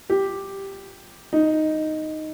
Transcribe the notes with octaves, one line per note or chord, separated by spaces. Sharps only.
G4
D#4